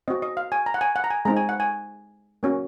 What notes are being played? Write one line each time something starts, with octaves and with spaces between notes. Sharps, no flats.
C4 F#4 D#5
D#5
F5
G#5
A#5
F#5
G#5
F#5
A#5
G#5
G#3 C4 D#4 A#5
G#5
F#5
G#5
A#3 C#4 F#4